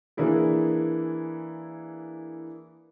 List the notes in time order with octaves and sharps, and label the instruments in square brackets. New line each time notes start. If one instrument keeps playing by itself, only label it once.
[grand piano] E3 A#3 D4 E4 G#4